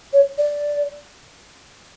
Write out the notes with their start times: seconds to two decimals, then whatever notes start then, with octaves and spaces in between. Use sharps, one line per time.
0.13 C#5
0.38 D5